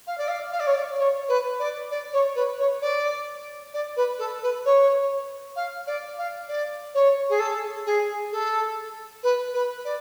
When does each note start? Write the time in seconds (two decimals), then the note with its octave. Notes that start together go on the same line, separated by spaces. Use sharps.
0.07 F5
0.17 D5
0.28 F5
0.52 F5
0.59 D5
0.66 C#5
0.73 D5
0.94 D5
0.98 C#5
1.28 B4
1.59 D5
1.90 D5
2.13 C#5
2.35 B4
2.59 C#5
2.81 D5
3.73 D5
3.96 B4
4.18 A4
4.42 B4
4.65 C#5
5.56 F5
5.86 D5
6.18 F5
6.48 D5
6.94 C#5
7.29 G#4
7.39 A4
7.86 G#4
8.32 A4
9.23 B4
9.53 B4
9.84 D5